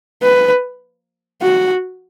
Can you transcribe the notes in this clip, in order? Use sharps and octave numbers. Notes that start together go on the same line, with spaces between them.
B4
F#4